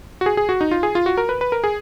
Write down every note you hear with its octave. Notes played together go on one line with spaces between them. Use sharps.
F#4
G#4
G#4
F#4
D#4
F4
G#4
F4
F#4
A#4
B4
B4
A#4
G#4